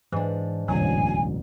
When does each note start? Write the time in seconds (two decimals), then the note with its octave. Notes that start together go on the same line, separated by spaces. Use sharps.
0.12 G#2 E3 D4
0.68 E1 A1 D2 F#3 G#5